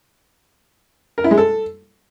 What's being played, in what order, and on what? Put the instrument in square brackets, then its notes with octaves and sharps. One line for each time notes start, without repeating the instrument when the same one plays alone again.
[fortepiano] A#4
E4
G#3
A4